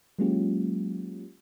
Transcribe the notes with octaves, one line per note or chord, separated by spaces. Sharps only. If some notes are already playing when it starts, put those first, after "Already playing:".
F#3 G#3 A#3 C#4 F4 G4